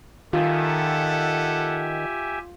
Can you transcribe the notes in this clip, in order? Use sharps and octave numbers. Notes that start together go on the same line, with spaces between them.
D#3 F4 G4 A4 E5 F#5 G#5